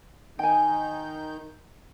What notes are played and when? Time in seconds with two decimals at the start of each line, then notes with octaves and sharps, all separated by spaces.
0.39 D#3 D#4 G5 G#5 G6